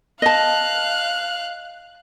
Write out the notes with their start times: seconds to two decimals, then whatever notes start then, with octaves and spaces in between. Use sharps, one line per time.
0.22 D#5 F5 A5 F#6